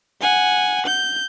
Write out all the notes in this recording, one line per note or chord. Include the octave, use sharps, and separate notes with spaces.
F#5 G#5
G6